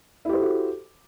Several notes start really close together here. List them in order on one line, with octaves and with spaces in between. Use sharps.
E4 G4 C5 A4 F#4